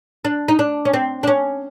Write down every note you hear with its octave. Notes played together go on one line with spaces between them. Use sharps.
D4
D#4
D4
C#4
C4
D4
C#4